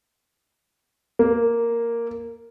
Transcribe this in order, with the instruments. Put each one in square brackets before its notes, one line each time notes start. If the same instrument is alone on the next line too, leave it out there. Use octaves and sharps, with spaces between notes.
[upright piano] A#3